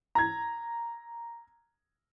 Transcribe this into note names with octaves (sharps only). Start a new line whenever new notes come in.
A#5 G#6